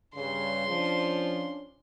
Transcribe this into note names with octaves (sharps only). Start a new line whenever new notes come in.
G2 C#3 C6
F3 C#4 D4